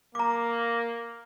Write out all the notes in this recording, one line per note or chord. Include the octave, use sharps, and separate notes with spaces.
A#3 A#5 D6